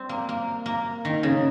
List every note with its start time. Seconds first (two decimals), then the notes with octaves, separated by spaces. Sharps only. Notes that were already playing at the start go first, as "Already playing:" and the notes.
Already playing: G3 C4
0.09 A#3
0.29 A#3
0.66 A#3
1.05 D#3
1.23 C#3